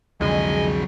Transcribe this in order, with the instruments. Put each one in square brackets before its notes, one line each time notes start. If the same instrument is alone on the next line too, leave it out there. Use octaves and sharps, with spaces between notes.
[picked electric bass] C2 F2 D3 [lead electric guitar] F#3 G#4 [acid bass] G#3 [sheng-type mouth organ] D#5 G#5